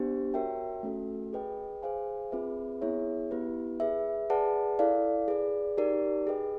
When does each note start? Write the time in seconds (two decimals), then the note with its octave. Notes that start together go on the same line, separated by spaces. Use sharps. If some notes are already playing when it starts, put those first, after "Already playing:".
Already playing: B3 D4 G4 C5
0.34 F#4 A#4 C#5 E5 G5
0.83 A3 C#4 F#4 A4
1.33 G#4 B4 D#5 G5
1.83 G#4 C5 F5 G#5
2.31 C4 F4 G#4 B4 E5
2.81 B3 E4 G#4 C#5 E5
3.31 B3 E4 G4 B4
3.80 G#4 B4 E5
4.30 G#4 B4 D5 F#5 A5
4.79 E4 A4 D5 F5
5.28 G#4 B4 D5
5.77 D#4 G4 A#4 D5
6.27 G#4 B4 D#5 G5